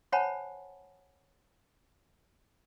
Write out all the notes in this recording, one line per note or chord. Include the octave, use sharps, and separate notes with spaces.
C5 C#5 F#5 G#5 A5 B5